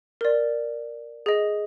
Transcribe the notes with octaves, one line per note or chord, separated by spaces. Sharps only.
A#4 D5
G#4 D#5